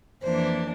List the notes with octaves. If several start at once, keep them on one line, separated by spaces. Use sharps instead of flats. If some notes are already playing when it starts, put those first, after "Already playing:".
F2 E3 A#3 D4 C5